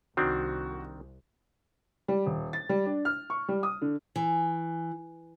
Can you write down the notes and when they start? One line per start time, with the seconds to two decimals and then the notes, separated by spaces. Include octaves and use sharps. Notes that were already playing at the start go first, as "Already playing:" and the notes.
0.17 C2 D#3 C4 D4 F#4
2.08 G3
2.26 D#1
2.53 A6
2.69 G3
2.86 D4
3.05 F6
3.30 C#6
3.48 G3
3.63 D#6
3.82 D3
4.16 E3